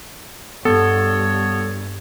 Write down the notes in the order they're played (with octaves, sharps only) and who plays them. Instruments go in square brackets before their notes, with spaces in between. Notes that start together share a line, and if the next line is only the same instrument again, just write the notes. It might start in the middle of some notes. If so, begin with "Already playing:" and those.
[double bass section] G2 [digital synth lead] B3 [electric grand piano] A4 [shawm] C#5